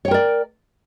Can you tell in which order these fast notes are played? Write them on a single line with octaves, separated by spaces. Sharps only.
C#5 G5 A#4 D5